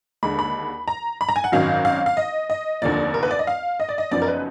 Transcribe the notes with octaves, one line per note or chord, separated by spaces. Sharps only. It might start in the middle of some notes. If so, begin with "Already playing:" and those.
D#2 D3 G#3 B5
B5
A#5
B5
A#5
G#5
F#5
G#1 F#2 D#3 F#3 F5
F5
F5
D#5
D#5
F1 D#2 D3 F3 A#3 D5
A#4
B4
D5
D#5
F5
D#5
D5
D#5
F#1 F#2 F3 B3 D#4 D5
A#4
B4